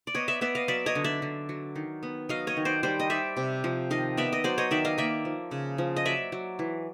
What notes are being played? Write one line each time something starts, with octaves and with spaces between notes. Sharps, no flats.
D5
B3 C#5 D#5
D5 E5
B3 D5 E5
D#5 F5
F#3 D5 E5
C#5 D#5
D3
D5 E5
D3
F#3
D#3
B3
F#3 D#5 F5
C#5 D#5
D#3
C5 D5
G3 C5 D5
D#5
G3 D5 E5
C3
F3
D#3 D#5 F5
B3 D5 E5
D#5
F#3 C5 D5
C#5 D#5
D#3 D5 E5
D#5 F5
A#3 D5 E5
F3
C#3
F3
D#5
F#3 D5 E5
F#3
E3